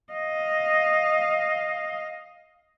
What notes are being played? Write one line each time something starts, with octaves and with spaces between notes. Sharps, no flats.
D#5 F5